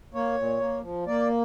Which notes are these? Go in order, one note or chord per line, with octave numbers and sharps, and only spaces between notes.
A#3 C#5
A#2
A#3
F3
A#3 D5